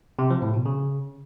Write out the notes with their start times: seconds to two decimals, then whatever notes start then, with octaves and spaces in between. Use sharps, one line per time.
0.19 C3
0.30 F3
0.42 A2
0.54 B2
0.66 C#3